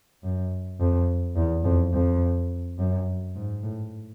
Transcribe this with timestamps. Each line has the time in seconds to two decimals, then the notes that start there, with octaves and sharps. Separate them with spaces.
0.23 F#2
0.80 F2
1.36 E2
1.64 F2
1.93 F2
2.78 F#2
3.35 G#2
3.63 A2